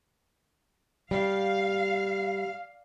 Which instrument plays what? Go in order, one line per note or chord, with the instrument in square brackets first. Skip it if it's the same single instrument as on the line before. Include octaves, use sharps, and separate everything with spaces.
[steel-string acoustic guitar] G3 [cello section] F5